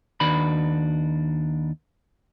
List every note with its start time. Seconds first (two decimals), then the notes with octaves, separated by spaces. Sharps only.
0.20 D#2 D#3 D4 F#4 B4 B5